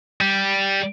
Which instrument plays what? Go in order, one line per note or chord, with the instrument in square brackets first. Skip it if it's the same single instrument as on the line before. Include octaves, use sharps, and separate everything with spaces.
[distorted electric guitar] G3